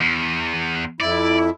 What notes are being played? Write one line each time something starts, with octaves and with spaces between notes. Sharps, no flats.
E2
F2 E4 D5